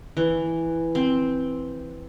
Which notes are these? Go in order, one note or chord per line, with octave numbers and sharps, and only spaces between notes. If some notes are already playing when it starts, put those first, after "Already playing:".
E3
C4